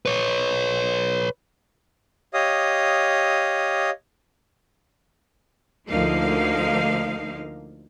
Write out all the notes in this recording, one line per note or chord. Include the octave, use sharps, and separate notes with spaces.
B4 C#5
G4 C#5 D#5 F5 D#6
D2 D3 F3 A#3 D#4 F5